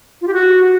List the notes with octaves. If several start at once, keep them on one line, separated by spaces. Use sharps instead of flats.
F4
G4
F#4